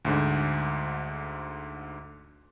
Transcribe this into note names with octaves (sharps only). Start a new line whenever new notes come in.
D2 G#2 D3